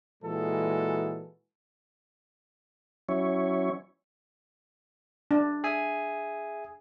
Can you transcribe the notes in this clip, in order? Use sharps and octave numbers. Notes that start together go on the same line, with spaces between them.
A#2 E3 G#3 F#4 A4
F#3 C#4 E4 C#5
D4
G#4 E5 G#5